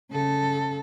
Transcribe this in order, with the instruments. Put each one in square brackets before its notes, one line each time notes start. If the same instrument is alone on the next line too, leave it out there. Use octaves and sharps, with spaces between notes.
[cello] C#3 A4